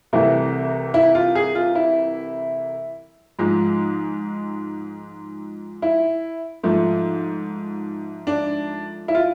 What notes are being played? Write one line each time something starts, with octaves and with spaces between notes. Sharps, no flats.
C2 C3 E3 A3 E4
E4
F4
G#4
F4
E4
G#2 F3 G#3
E4
G#2 F3 A3
D4
E4
F4